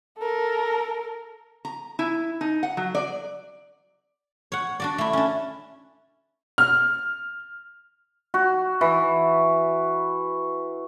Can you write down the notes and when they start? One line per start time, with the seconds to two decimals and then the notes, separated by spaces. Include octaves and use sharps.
0.18 A4 A#4
1.65 A#5
1.99 E4
2.41 D#4
2.63 F#5
2.77 F#3
2.95 D5
4.52 C#5 F#5
4.80 D4 F#4 D5
4.98 A3 E4
5.13 C#4 D4
6.58 F6
8.34 F#4
8.81 E3